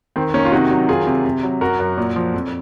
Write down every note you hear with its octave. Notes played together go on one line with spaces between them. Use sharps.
D#3 C4
D#3 A#3 C#4
F4
C3 D#4 F#4
F#3
D#3 F4 G#4
C3
C3
F#3
F#2 F#4 A#4
F#2
A#2
F3
F2